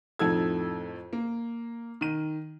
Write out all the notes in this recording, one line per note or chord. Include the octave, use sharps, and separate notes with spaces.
F2 A2 D#4 A4 E6 G#6
A#3
D#3 D#7